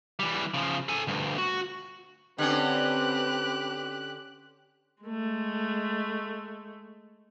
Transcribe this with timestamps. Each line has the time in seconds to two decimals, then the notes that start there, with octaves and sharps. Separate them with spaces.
0.19 E3 G3
0.54 C#3 F3
0.89 A4 G#5
1.07 D2 G2
1.38 F#4
2.38 D3 C4 C#4 G4 B4 F#6
5.03 G#3 A3